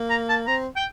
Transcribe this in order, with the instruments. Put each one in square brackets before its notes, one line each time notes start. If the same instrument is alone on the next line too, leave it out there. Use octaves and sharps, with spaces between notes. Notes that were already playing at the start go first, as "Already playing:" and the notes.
Already playing: [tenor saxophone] A#3
[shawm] A#5
A5
[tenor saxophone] C4 [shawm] A#5
[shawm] G5